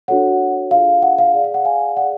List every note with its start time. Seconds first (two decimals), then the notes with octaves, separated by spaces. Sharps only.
0.08 D4 F#4 A4 C#5 F#5
0.71 D4 F4 G#4 F5
1.02 F#5
1.18 F5
1.34 G#4 D5
1.44 F5
1.54 F#5
1.65 F5 G#5
1.97 G#4 D5 F#5